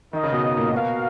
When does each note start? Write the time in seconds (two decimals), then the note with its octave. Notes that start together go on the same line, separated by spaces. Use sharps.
0.13 D#3 D#4 A#4 D#5
0.23 C#3
0.33 B2
0.43 B2
0.57 A#2
0.71 B2 B3 F#4 A#4 F5